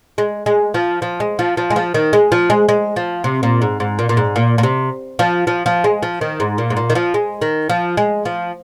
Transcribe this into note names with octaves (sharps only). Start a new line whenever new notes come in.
G#3
G#3
F3
F3
G#3
F3
F3
G#3
F3
D#3
G#3
F3
G#3
G#3
F3
C3
A#2
G#2
G#2
A#2
A#2
G#2
A#2
A#2
C3
F3
F3
F3
G#3
F3
D#3
G#2
A#2
G#2
A#2
D#3
F3
G#3
D#3
F3
G#3
F3